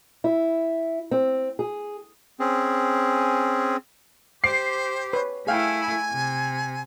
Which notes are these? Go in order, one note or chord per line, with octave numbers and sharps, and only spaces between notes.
E4
C4
G#4
C4 C#4 G#4
G4 C5 D6 C7
B4 C#5
A3 E4 G#4 F5 G5 G#5
C3